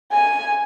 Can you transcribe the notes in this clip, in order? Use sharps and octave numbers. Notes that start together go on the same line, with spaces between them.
G#5